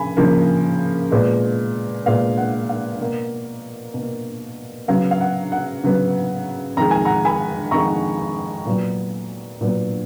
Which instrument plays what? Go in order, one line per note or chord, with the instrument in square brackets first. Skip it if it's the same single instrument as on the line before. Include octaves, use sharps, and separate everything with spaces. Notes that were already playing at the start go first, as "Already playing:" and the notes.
Already playing: [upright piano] C#3 F3 A#3 G#5 B5
C#3 F3 A#3
A#2 G#3 B3
A#2 G#3 B3 F5
F#5
F5
B2 A#3
B2 A#3
C#3 F#3 B3 F5
F5
F#5
F#5
C#3 F#3 B3
F2 D#3 G#3 A#5
G#5
F#5 A#5
G#5 B5
F2 D#3 G#3 A#5 C#6
A#2 F#3 B3
A#2 F#3 B3